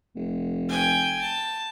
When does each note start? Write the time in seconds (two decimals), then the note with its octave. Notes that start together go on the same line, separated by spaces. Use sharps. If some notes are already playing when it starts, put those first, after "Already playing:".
0.16 F1
0.69 G5 G#5
1.21 A5